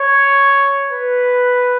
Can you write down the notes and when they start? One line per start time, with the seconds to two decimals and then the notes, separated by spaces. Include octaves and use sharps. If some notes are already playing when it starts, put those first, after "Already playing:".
Already playing: C#5
0.91 B4